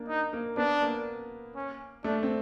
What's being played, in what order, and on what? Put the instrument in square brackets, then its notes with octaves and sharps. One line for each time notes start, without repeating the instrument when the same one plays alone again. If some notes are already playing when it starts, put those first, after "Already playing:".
Already playing: [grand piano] A#3 D4
[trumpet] D#4
[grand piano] A#3
[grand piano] B3 [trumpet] D4
[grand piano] A#3
[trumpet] C#4
[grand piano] A3 [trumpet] D4
[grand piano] C4